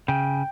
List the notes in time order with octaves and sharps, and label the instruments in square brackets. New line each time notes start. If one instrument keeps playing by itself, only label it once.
[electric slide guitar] C#3 [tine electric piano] G5